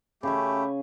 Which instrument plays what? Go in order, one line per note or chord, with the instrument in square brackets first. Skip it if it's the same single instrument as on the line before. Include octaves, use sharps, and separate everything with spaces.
[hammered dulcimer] C#3 G#5 [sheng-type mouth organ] A3 G4 [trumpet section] B5